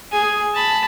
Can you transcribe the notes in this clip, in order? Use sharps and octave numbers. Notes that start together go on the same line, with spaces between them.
G#4 G#5
A5 B5